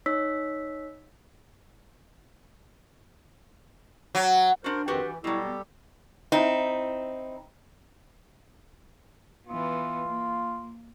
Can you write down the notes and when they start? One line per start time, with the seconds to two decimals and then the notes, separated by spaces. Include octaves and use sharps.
0.06 D#4 C#5 E6 B6
4.15 F#3
4.64 D4 F#4 A#4 C5
4.88 F2 D#3 G3 C4 F#4 G4 B4
5.03 E3
5.24 B2 F#3 G3 E4 G4 A4
5.46 B3
6.32 C4 D#4 E4
9.47 E3 B3 F4
10.07 A#3